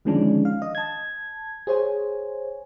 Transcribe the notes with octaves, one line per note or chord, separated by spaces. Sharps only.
D3 D#3 F3 G#3 C#4 D4
F5
D#5
A5 G#6
G#4 C5 C#5 G#5